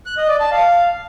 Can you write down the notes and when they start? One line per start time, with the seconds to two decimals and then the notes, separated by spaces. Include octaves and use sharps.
0.06 F#6
0.17 D#5
0.29 D5
0.40 A5
0.51 F5